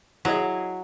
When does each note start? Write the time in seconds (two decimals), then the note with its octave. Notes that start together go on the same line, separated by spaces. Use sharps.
0.25 F#3 E4 G#4 D#5